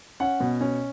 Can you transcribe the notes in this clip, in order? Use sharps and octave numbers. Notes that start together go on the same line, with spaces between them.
C#4 F#5
B2
C#4